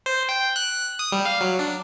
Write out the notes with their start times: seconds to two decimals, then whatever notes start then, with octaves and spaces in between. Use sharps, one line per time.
0.06 C5
0.29 G5
0.56 F#6
0.99 D#6
1.12 G3
1.26 F5
1.41 F#3
1.59 D4